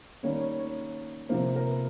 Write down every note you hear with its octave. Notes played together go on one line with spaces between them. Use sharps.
D#3 G3 A#3 C#4 C#5
C#5
C#5
C3 F3 A#3 C5
A#4
B4